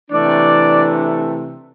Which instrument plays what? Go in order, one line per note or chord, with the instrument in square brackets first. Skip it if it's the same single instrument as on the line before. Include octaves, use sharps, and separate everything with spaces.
[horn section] C3 E3 A3 D4 D5